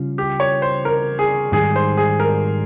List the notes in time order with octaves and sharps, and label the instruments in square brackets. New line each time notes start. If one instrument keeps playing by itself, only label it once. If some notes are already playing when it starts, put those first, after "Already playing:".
Already playing: [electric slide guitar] C#3 G3 C#4 F4
[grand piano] G4
C#5
C5
A#4
G#4
[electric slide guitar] G#2 D#3 G3 [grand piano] G#4
[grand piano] C5
G#4
A#4